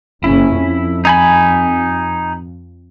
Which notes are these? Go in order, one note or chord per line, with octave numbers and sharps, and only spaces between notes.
F#1 C#4 E4
F2
D#4 G#5 B5